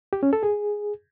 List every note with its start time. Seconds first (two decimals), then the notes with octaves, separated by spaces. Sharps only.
0.13 G4
0.23 C#4
0.33 A4
0.43 G#4